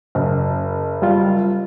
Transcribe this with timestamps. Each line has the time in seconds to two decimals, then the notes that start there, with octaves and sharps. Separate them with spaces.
0.15 F#1
1.02 G3 F4